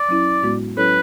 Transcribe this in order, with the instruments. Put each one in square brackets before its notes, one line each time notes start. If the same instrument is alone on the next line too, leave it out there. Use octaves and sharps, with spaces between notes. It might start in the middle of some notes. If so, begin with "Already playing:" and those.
Already playing: [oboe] D5
[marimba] F#3 C#4 E4
A2 G#3 B3 F#4
[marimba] F#3 C#4 E4 A4 C#5 [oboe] B4